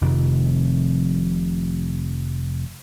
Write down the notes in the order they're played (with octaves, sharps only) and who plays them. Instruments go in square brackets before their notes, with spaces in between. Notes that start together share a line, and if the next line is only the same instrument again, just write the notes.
[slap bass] F1 F2 C3 D#3